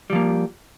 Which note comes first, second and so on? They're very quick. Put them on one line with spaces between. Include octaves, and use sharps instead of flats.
G3 F3 A#3